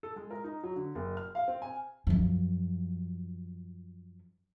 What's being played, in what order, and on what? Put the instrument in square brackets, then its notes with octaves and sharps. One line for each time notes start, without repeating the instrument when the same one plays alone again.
[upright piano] A4
G#3
A#4
D#4
F#3
D3
F#1
F6
F5
C4
G#5
[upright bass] F#2 F3